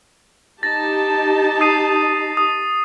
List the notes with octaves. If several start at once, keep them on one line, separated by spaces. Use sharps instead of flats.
D#4 G4 A5 A6 A#6
D#6 C7 D#7
D#6